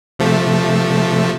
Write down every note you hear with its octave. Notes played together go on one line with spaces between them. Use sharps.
C3 F3 A3